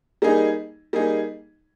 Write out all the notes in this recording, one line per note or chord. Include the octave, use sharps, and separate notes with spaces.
G3 A#3 D#4 G#4
G3 A#3 D#4 G#4